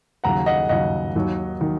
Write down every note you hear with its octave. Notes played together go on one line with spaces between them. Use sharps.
D#2 C#3 F#3 F#5 A#5
D#5 F#5
D#2 C#3 F#3 D#5 F#5
D#2 D#3 F#3
D#3 F#3